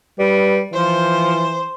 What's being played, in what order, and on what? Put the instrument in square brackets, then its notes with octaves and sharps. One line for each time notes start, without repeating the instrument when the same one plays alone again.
[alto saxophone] G3 [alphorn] B4
[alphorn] E3 [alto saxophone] F3 [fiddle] C5